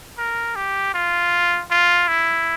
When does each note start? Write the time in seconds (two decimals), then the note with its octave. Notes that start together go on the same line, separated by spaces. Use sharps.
0.18 A#4
0.56 G4
0.94 F4
1.71 F4
2.08 E4